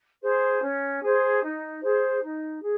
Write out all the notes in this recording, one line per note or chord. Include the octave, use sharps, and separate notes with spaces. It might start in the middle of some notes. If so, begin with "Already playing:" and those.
G#4 C5
C#4
G#4 C5
D#4
G#4 C5
D#4
G#4